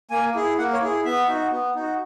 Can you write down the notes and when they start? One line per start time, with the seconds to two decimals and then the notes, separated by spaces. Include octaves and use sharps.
0.11 A#3 G#5
0.35 E4 G#4
0.58 A#3 F#5
0.73 C#5
0.82 E4 G#4
1.05 B3 E5
1.28 D#4 F#4
1.52 B3
1.75 D#4 F#4